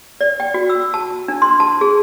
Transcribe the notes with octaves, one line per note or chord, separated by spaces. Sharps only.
D5
G5
F#4
E6
A5
D4
C6
A5
G#4